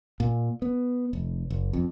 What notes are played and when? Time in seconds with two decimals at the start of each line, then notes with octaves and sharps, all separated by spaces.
0.20 A#2
0.62 B3
1.13 F1
1.50 F#1
1.73 F2